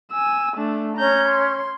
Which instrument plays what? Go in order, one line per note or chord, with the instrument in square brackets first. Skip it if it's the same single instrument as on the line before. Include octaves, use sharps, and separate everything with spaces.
[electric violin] G#5 E6
A3 D4
[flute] C#4 [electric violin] A#5 G6
[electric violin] C6